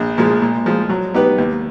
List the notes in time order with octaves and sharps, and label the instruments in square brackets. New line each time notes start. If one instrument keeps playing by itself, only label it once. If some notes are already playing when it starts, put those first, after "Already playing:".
Already playing: [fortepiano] A#1
A#2 F3 G#3
A#2
F3 G#3
F#3
B3 D#4 G4 B4
D#2